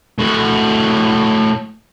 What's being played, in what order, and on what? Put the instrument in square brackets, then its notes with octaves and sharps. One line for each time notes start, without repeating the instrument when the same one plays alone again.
[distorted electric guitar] A2 F#4